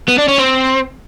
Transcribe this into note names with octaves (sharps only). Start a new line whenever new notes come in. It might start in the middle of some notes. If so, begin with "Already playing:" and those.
B3
D4
C#4
C4